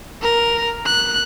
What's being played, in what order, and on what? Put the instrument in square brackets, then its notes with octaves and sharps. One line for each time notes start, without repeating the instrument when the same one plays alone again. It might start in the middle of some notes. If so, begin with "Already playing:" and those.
[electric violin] A#4
F#6